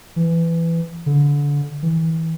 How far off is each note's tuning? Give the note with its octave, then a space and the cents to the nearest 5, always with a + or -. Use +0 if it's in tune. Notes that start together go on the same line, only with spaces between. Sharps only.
E3 +15
D3 -25
E3 -25